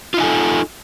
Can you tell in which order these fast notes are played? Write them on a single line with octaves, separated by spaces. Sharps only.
F4 D#4 G#5 A4